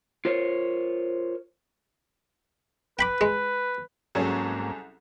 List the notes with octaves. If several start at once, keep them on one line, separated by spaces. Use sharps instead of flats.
F4 A#4 C5 C#5
B4 G5 B5 D6
G#3
C2 G#2 F#3 A#3 C#4 G#4 A4